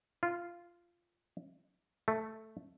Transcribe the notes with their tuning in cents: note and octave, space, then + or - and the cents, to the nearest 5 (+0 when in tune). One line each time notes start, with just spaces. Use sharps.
F4 -10
A3 +0